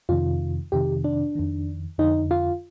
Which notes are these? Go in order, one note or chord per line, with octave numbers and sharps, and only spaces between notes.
F2 C3 D#3 F4
F2 C3 D#3 G4
D4
F2 D#3
F2 D3 D#4
F4